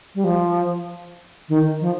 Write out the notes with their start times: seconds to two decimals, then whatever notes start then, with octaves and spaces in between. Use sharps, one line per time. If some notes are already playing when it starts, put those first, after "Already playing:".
0.15 G3
0.24 F3
1.49 D#3
1.81 F3